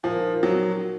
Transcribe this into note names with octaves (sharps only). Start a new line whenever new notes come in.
A#2 F3 G#3 D#4 A#4
F#3